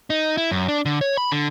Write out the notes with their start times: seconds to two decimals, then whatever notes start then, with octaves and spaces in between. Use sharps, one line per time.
0.10 D#4
0.37 E4
0.51 F#2
0.68 D4
0.85 D3
1.01 C#5
1.17 B5
1.32 D3